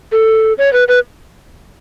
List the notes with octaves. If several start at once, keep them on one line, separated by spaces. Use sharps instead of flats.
A4
C#5
B4
B4